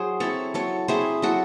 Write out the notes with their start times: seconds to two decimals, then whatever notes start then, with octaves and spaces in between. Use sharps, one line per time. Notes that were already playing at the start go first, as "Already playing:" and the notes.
Already playing: F#3 G#4 C5
0.20 C4 E4 A4 C#5
0.54 F#3 A4 C#5
0.88 C4 E4 G#4 C5
1.22 F#3 F#4 A4